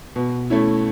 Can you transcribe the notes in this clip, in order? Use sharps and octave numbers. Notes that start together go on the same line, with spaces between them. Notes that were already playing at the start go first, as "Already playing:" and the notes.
B2
A3 C#4 E4